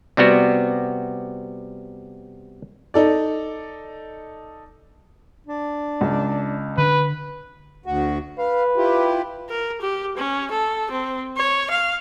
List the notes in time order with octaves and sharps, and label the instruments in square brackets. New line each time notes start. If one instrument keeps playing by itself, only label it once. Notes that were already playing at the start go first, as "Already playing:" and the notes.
[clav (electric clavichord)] C3 G3 B3 F#4
[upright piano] D#4 A4 D5
[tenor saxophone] D4
[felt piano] C#2
[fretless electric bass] D3 D4 [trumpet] B4
[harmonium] D2 F#4
[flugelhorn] B4 [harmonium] F5
[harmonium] E4 F4 G4
[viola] A#4
G4
C#4
A4
C4
C#5
F5